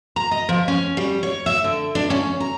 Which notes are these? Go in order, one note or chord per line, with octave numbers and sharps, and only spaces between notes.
A#5
D#5
F3
C#4
G3
C#5
E5
D3
D4
C#4
A#5